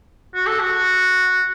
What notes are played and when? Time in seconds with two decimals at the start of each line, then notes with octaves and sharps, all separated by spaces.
0.35 F#4
0.47 A4
0.60 F#4